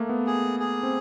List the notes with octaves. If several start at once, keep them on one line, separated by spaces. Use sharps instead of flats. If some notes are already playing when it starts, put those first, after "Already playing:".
Already playing: A3 A#3
B3
G#4
G#4
C4